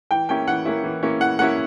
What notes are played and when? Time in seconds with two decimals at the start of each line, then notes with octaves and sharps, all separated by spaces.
0.11 E3 G5
0.29 A#3 C#4 E4 G5
0.48 E3 F#5
0.65 A#3 C#4 E4
0.84 E3
1.03 A#3 C#4 E4
1.21 E3 F#5
1.39 A#3 C#4 E4 F#5